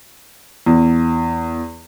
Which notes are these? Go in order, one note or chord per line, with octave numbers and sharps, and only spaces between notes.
E2